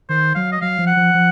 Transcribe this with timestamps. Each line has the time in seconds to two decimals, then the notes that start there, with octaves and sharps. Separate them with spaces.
0.09 D#3 C5
0.35 F#3 F5
0.52 D#5
0.62 F#3 F5
0.79 F3
0.87 F#5
0.96 F3
1.14 F3